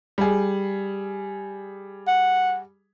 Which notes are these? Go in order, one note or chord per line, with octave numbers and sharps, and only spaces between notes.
G3 G#4
F#5